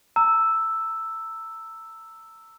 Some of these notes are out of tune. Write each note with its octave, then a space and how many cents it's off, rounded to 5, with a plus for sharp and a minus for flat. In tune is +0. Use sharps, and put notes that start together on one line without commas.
A#5 -35 E6 +0